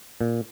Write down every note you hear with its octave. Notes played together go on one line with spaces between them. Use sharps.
A#2